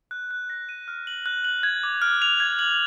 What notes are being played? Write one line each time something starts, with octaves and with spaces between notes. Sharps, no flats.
F#6
F#6
A#6
D#7
F6
F#7
F#6
F#7
G#6
D6
F6
F7
G#6
F#7